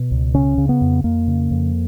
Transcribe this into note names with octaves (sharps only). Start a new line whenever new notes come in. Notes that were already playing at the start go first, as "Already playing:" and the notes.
Already playing: B2
C#2
C#3 C#4
C#3
B3
F2
F2 A#3
C#3
F2